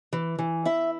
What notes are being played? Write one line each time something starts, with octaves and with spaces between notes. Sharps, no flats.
E3
E3
E4 E5